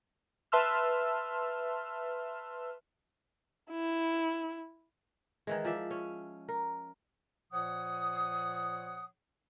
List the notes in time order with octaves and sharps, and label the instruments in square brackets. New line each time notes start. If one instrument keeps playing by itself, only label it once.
[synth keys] B4 E5 A5 C6 E6 F6
[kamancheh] E4
[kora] D#3 E3 G#3
F3 D5 E5
C#4
A#4
[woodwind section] A#2 F3 C#5 F#5 D#6